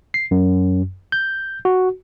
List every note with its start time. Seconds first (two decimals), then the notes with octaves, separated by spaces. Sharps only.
0.14 C7
0.31 F#2
1.12 G6
1.65 F#4